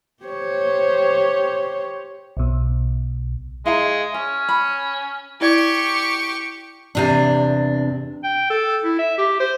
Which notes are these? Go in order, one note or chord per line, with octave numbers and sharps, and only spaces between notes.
G4 C5 C#5
B1 B2
G#3 E4 F5 A#5
C#4 C#5
B5
E4 G4 D5 C#6
E2 C3 D4
G5
A4
E4
E5
G4
C5